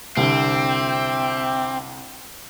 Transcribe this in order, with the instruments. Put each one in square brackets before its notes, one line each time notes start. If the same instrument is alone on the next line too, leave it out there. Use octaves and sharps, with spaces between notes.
[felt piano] C2 D3 [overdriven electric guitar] C4 [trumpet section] E5 G5 D6